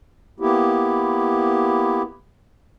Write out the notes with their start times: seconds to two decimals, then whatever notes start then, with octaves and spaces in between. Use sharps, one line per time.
0.40 A#3 B3 E4 G4